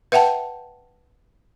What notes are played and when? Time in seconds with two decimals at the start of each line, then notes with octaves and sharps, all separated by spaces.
0.12 B4 E5 F#5 G5 A5